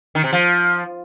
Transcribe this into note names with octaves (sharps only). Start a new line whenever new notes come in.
D#3
C3
F3